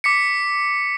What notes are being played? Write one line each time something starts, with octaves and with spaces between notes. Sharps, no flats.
D6 B6 C#7